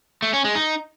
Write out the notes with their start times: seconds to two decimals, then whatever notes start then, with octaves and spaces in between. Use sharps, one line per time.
0.22 A3
0.33 C#4
0.44 G#3
0.55 D#4